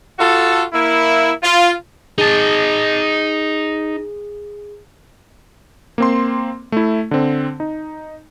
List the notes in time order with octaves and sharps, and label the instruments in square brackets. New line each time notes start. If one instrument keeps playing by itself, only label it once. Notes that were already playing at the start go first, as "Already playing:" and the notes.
[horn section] F4 F#4 A4
A#3 E4
F4
[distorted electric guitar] D#4 A5 [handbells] G#4
[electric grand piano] A#3 C4 C6
A3 E4
D3 C4
D#4